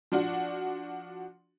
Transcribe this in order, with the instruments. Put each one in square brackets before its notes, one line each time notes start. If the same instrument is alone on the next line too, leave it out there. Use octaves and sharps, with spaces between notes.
[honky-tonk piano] F3 D4 F#4